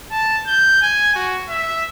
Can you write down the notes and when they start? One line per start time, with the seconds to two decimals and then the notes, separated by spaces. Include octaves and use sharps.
0.11 A5
0.47 G6
0.82 G#5
1.15 F#4
1.49 E5